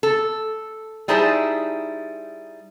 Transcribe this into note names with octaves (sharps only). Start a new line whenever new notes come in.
A4
G3 D#4 E4 G#4 C5 A5